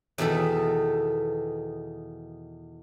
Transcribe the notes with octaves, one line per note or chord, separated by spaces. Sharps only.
E2 B2 D#3 A4